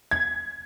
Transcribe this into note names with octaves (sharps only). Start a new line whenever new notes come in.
G#6